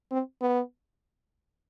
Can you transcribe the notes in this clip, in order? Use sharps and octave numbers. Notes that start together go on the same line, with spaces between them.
C4
B3